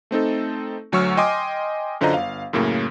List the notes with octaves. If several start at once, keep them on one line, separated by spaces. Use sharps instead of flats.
A3 C4 D#4 A4
D2 F#3 C#5 C#6 E6 F6
D#5 G5 G#5 C6 D6 D#6
F#2 D3 F4 C5 D#5 A#5
G1 F5
F#2 A2 C#3 A#3